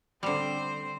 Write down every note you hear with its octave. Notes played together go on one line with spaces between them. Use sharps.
D3 G3 C4 C5